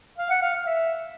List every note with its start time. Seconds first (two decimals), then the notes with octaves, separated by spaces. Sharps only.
0.18 F5
0.30 F#5
0.42 F5
0.54 F5
0.66 E5